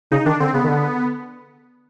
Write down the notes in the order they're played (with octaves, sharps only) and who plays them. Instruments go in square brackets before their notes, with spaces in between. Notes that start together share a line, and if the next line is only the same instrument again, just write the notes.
[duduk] C#3 [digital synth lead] D#4
[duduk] D#3 [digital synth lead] D4
[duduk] D3 [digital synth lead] C4
[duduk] C#3 [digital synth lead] B3
[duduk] D#3
D3